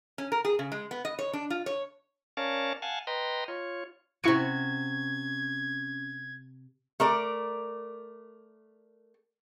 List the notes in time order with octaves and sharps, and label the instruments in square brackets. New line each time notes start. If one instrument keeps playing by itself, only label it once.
[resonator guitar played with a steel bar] C#4
A#4
G#4
C#3
G#3
B3
D#5
C#5
D4
F4
C#5
[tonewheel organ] C#4 A#4 C#5 D5 F5 A5
F5 F#5 G#5 A5
B4 D#5 G5 A#5 C6
F4 C#5
[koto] C3 F#4 [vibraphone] C#4 [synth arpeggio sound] E4 C#6 C#7 [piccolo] G#6
[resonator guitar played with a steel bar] A3 A#4 D5